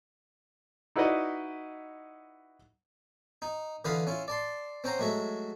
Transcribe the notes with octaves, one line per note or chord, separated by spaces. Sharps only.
D#4 E4 F#4 B4 D5 D#5
D#4
D3 E3 F4 B4 F5 D#6
C#4 E4 F4
D5 A5 C6
C4 C#4 C5 F#5 A#5
F#3 G#3 A3 F#4 E5